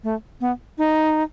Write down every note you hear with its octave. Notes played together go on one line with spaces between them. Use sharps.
A3
B3
D#4